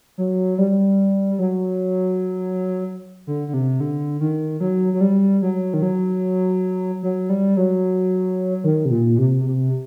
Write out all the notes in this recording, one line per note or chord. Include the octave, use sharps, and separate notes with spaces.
F#3
G3
F#3
D3
D3
C3
D3
D#3
F#3
F#3
G3
F#3
D#3
F#3
F#3
G3
F#3
D#3
C3
A#2
C3
C3